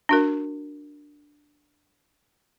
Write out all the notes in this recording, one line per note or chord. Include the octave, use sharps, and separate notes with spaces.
D4 F#4 A#4